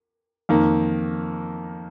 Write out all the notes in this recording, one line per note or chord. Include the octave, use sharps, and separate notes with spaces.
F2 D#3 A#3